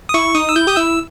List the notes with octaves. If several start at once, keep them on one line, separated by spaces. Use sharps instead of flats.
D#6
E4 C#6
D#4 D#6
E6
E4 G6
G4 D#6
E4 E6